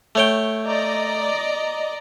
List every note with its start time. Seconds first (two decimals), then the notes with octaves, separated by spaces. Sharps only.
0.15 A3 C#5 G5
0.67 D5 D#5 A#5